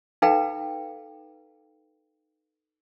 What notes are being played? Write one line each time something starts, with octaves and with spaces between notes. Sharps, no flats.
D#4 A4 B4 F5 G5 A#5